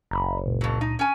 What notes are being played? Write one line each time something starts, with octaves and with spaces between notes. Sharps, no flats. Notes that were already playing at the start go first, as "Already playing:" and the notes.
F#1 A#5 B5
C#2 A#2
F2 F#3
D#4
C#4 G#5